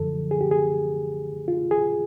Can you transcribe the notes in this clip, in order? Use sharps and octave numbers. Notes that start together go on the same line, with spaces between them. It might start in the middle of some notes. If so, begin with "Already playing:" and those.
Already playing: F#2 D3 F3 A4
G#4
G4
G#4
F4
G#4